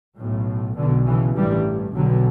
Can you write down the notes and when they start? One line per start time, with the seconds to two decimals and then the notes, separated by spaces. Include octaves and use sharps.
0.18 B1 A2
0.77 B1 B2 D3
1.06 C#3 E3
1.36 A1 G2 E3 G3
1.95 B1 B2 D3 F#3